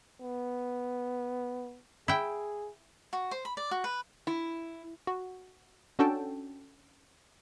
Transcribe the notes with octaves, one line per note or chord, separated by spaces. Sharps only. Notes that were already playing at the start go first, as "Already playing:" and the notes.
B3
E4 G#4 G5
F#4
C5
B5
D5
F#4
B4
E4
F#4
C#4 D4 F#4 A4 G5 A5